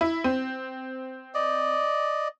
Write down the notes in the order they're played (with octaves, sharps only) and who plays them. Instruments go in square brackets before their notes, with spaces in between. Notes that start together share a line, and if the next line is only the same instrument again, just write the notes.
[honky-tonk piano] E4
C4
[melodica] D5 D#5